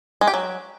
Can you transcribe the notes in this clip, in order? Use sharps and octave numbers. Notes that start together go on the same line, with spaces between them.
G#3
G4
F#3